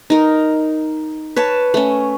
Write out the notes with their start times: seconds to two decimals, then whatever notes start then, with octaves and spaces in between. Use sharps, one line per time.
0.10 D#4 A#4
1.36 B4 C#5 A5
1.74 A3 C#4